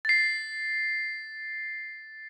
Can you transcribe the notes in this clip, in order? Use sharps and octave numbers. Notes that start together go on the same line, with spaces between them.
A6 C7